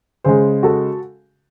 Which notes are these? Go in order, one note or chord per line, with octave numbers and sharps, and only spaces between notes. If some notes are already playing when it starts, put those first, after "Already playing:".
C#3 G#3 G#4 C5
F#4 A4